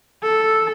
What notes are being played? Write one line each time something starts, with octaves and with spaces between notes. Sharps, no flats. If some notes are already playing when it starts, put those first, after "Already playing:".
A4